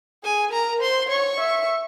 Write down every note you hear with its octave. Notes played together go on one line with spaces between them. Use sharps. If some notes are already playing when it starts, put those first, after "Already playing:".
G#4 G#5
A#4 A#5
C5 C6
C#5 C#6
E5